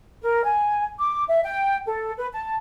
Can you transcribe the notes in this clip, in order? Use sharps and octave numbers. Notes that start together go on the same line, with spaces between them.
A#4
G#5
D6
E5
G5
A4
B4
A5